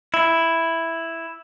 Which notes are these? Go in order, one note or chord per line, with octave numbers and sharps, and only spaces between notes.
E4